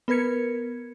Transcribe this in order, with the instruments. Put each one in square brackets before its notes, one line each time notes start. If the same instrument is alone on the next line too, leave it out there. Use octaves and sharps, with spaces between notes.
[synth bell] B3 A#4 B4 G#6 C#7